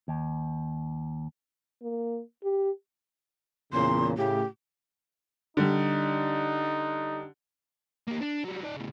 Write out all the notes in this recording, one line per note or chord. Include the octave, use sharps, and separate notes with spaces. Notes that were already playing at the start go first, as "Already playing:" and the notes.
D#2
A#3
G4
E2 A#2 C#3 C6
A2 C#3 G4
D3 G3 D#4
A#3 G4
D4
F#3 G3
D#4 D5
A2 C#3